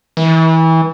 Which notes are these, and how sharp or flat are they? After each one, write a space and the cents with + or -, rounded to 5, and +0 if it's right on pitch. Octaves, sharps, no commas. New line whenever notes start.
E3 -25